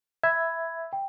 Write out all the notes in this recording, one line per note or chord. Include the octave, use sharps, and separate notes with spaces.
E5 B5 G#6
G5